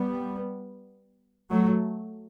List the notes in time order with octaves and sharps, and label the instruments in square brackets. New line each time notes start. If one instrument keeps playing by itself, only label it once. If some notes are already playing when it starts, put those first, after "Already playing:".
Already playing: [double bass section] G3 B3
F#3 A3